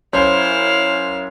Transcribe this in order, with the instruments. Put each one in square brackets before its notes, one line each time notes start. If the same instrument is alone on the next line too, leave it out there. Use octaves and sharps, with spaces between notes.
[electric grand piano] F#2 C#4 C#5 [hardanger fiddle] E4 F5 [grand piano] C5